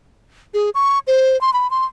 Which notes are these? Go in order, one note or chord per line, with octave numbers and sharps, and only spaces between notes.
G#4
C#6
C5
C6
B5
C6